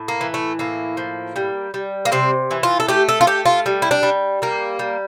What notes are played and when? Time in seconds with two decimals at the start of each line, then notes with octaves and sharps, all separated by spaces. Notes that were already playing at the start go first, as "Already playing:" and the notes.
Already playing: A2
0.08 A#3
0.21 E3
0.34 A3
0.59 A2 A#3
0.97 F3
1.36 G3
1.74 G3
2.05 A#3
2.12 C3 C4
2.51 E3
2.63 F4
2.80 A4
2.88 A3 G4
3.09 A4
3.21 F4
3.27 A3 G4
3.46 F4
3.66 G3
3.82 E4
3.91 D4
4.03 G3
4.42 G3 A#3
4.79 G3